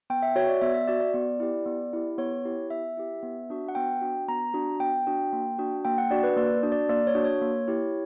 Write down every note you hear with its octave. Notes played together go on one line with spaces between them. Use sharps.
B3 G5
E5
F#4 C#5
D5
B3 E5
E5
F#4 D5
D5
B3
E4 G4
B3
E4 G4
B3 C#5
E4 G4
B3 E5
E4 G4
B3
D4 F#4
F#5
B3 G5
D4 F#4
B3 A#5
D4 F#4
B3 G5
D4 F#4
A#3
D4 F#4
A#3 G5
F#5
D4 F#4 D5
B4
A#3 D5
D4 F#4
D5
A#3 D5
C#5
D4 F#4
C#5
A#3
E4 G4